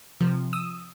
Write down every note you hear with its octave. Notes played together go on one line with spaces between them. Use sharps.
C3 F3
D#6 E6